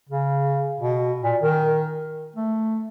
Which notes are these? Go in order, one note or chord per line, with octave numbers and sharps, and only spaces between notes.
C#3
B2
A#2
D#3
A3